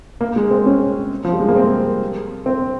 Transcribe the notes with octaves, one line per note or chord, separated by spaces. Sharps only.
A#3
G#3
C4
C#4
F3
G3
G#3
A#3
C4
C4